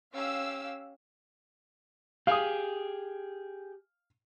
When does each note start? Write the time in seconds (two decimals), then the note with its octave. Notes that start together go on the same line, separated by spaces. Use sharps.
0.14 C#4 G4 F5 E6
2.27 G4 G#4 F5 D#6